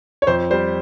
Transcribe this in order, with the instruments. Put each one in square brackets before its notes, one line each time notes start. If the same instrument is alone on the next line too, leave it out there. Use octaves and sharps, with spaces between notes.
[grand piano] C#5
F2 C5
G3 C5